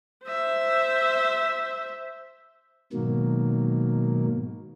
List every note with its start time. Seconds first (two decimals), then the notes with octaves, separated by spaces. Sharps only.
0.25 C5 E5
2.93 G#2 B2 D#3 F#3 A#3